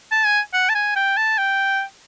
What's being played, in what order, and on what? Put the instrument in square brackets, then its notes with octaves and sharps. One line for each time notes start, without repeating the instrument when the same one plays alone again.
[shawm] A5
G#5
F#5
A5
G#5
G5
A5
G5